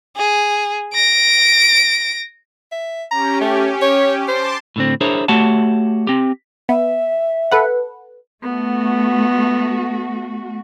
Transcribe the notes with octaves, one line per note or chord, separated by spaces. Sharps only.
G#4
A#6 D7
E5
C#4 G4 A#5
A3
C#5
C5 A5 C6 D6
A2 D3 C4
D4 E4 G#4 A#4 C5 C#5
A3 F#4 G4 C#5 F#5 A5
C4 G4
B3 E5
A4 B4 F#5
A3 B3 F#4